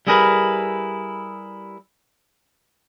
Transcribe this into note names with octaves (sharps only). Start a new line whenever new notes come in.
G3 E4 G#4 A#4 B4